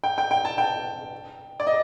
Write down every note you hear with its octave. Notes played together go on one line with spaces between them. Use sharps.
G5
G5
G5
A5
G5
D5
D#5